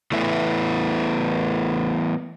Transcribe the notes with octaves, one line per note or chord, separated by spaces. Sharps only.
E3 A3 B3 E4